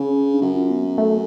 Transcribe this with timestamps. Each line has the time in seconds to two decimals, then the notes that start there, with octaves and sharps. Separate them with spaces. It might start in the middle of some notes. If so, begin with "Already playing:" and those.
Already playing: C#3 C#4
0.34 D4
0.42 F#2 C#4
0.55 F4
0.70 B3
0.98 A3